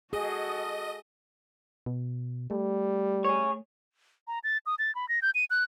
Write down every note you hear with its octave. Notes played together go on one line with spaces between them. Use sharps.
F#4 G#4 A4 D#5
B2
G3 A3
G#4 C#5
A#5
A6
D#6
A6
B5
A#6
G6
D#7
F#6